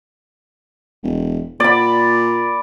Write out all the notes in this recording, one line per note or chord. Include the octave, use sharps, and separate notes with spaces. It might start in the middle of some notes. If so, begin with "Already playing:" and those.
E1
A#2 D5 B5